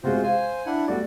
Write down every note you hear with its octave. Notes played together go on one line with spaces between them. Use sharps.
C3 G#3 F4 F#4 C5
C5 F5 G#5
D4 E4 F#5
G3 A3 F#4 D5